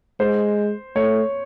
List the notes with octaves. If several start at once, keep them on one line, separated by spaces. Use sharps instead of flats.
G#3 C5
A3 C#5